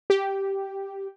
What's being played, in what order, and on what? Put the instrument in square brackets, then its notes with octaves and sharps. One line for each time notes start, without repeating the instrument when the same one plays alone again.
[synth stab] G4